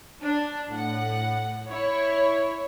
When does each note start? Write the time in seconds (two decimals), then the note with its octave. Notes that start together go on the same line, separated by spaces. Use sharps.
0.22 D4
0.69 A2 F#5
1.70 E4 C#5